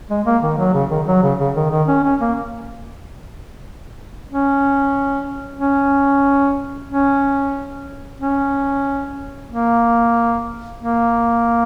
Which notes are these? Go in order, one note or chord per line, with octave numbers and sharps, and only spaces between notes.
G#3
A#3
D#3
F#3
C#3
D#3
F#3
C#3
C#3
D#3
D#3
C#4
C#4
A#3
C#4
C#4
C#4
C#4
A#3
A#3